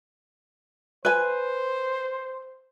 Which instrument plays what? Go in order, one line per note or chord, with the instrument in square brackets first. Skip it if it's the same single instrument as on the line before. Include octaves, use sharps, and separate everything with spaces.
[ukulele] B4 G#5 [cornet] C5